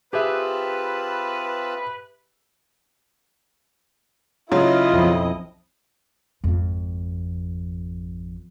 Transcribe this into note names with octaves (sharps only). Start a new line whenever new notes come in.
C4 F4 G4 G#4 B4 E5 A5
C#3 F#3 E4 F4 D#5
B1 F2
G#1 F2